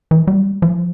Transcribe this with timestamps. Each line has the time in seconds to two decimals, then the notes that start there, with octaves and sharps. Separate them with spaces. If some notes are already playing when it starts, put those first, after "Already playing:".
0.11 E3
0.27 G3
0.62 F3